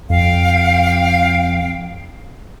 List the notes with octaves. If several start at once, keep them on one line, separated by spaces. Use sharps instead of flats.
F2 F5 G5